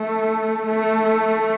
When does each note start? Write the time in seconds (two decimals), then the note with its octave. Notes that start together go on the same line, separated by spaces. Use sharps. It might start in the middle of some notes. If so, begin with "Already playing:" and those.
Already playing: A3
0.67 A3